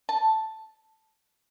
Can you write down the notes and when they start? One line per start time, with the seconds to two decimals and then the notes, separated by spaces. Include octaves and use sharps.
0.09 A5